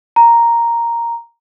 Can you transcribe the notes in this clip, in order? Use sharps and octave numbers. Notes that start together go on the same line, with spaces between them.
A#5